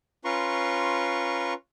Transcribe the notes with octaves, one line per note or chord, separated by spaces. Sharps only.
C#4 F4 B4 A#5 C6 C#6